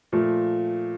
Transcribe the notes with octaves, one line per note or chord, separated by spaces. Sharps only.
A#2 F3 A3